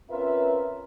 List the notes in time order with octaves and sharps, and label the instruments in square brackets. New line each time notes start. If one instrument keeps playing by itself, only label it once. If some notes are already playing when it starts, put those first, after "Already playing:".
[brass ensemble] C4 C#4 F4 A#4 B4 E5